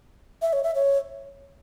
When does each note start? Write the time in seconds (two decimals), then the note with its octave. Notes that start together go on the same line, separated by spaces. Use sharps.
0.42 E5
0.53 C#5
0.63 E5
0.75 C#5